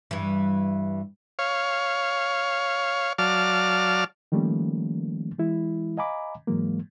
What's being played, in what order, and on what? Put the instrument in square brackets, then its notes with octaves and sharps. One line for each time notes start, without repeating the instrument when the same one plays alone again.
[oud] G2 E3
[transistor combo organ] C#5 F5
F#3 D5 F5 A5 F6
[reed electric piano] D#3 F3 G3 A3 A#3 C#4
E3 G#3 E4
D#5 F5 G#5 A#5 B5 D6
G#2 E3 F#3 G#3 A#3